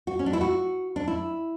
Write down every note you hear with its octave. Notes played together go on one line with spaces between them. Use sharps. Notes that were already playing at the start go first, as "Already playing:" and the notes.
F#4
C#4
D4
E4
F#4
D4
E4